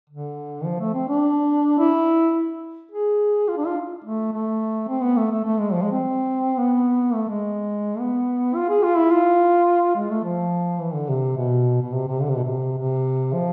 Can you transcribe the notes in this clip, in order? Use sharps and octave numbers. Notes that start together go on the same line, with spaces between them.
D3
F3
A3
C4
D4
E4
G#4
F4
D4
F4
A3
A3
C4
B3
A3
A3
A3
G#3
F3
G#3
C4
B3
A3
G#3
B3
F4
G#4
F4
E4
F4
G#3
A3
F3
E3
D3
C3
B2
B2
C3
C3
D3
C3
B2
C3
C3
F3